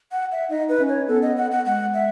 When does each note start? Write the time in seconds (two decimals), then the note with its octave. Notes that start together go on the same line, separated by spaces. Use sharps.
0.12 F#5
0.32 E5
0.50 D#4 D#5
0.69 B4
0.79 C#4
0.89 C#5
1.08 B3 A4
1.22 D#5
1.37 F#5
1.51 F#5
1.65 G#3 F#5
1.94 E5